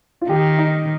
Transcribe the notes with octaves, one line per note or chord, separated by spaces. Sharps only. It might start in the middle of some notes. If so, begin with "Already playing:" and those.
F4
D#3 G4
D#4